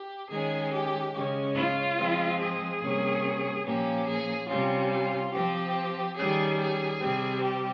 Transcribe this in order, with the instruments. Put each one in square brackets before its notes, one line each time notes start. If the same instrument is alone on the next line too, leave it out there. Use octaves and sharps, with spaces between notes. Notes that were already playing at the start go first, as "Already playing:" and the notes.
Already playing: [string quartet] G4
D#3 G#3 C#4 G#4
G4
C#3 G#3 C#4
F4
F3 G#3 C4
G#4
C3 G3 A#3 C#4
A#2 F3 A#3 C#4 G4
G#4
C3 G3 C#4 F4
F4
F3 C4 G4
D#3 G3 C#4 G#4
G#4
C3 G3 C4
G4